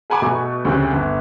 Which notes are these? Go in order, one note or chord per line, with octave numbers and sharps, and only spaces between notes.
G#4 F#5 G#5 B5 D6
B2 A3
D2 C#3 C4 G4 F#6
G1